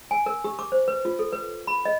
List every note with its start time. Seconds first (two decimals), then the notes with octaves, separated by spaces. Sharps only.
0.11 G#5
0.26 A#4
0.44 G4
0.59 D6
0.72 C5
0.88 B4
1.05 F4
1.19 A4
1.32 B4
1.67 B5
1.85 D#5